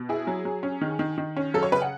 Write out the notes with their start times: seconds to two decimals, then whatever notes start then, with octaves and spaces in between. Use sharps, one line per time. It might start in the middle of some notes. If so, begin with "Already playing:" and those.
Already playing: B2
0.09 E4 G#4
0.27 F#3
0.45 F#3
0.63 C#4
0.81 D#3
0.99 D#3
1.18 D#3
1.37 C#4
1.54 F#3 A4
1.63 C#5
1.72 C#3 B4
1.82 F#5